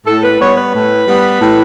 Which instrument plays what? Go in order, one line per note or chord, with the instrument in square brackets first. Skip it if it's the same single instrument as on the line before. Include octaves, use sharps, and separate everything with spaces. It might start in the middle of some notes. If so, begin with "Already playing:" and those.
[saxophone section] A2 A4
B4
G3 B3 C#5
B4
A2
G3 B3
A2